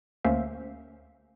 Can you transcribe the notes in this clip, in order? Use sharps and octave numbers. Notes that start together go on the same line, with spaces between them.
D2 A#3 C#4 C5 E5 F5